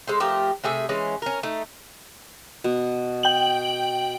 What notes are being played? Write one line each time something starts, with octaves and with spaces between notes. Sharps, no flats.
G#3 A4 C5
F3 A3 G4 A#4
C3 A3 G#4 E5
E3 G#3 C#4
C#4 A#4
A3 D#4
B2
G5 F#7